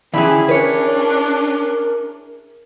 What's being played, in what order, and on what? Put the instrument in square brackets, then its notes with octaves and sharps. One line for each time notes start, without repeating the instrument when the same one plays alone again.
[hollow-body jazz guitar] D3 E3 [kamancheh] C#4 [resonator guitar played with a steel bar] E4 G4 G#4
[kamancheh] C#4 D4 [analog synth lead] A#4 [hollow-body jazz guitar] B4 C#5